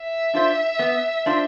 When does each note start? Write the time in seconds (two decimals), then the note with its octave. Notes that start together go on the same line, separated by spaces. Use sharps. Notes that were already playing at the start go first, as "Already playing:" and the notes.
Already playing: E5
0.33 D4 F4 C5
0.79 B3
1.26 D4 F4 C5